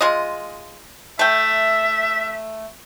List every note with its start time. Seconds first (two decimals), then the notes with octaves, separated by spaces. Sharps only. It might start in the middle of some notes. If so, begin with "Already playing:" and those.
0.01 G#3 F4 D#5
1.19 A3 E5 G5